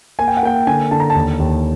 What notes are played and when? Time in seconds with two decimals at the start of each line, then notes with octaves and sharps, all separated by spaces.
0.19 A#3 G#5
0.28 G5
0.37 F#5
0.43 A#3 G5
0.67 D3 G#5
0.91 D3 A5
1.00 A#5
1.10 A5
1.15 D#2
1.40 D#2